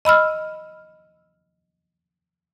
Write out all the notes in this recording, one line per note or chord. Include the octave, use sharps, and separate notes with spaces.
D#5 B5 E6 F6